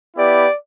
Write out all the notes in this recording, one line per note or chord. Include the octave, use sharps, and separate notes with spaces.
B3 E4 G4 D5